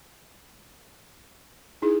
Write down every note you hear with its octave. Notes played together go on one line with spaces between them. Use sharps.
D#4 E4 G#4